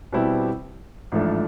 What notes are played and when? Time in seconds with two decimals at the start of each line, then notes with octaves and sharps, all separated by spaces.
0.13 B2 G3 C4 E4 G4
1.12 A1 G#2 F3 A3 D4